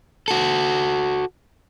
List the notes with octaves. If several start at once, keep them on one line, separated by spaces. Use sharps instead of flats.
F#4 A4